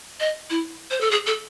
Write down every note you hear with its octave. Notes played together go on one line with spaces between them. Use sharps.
D#5
E4
C5
A4
G#4
A4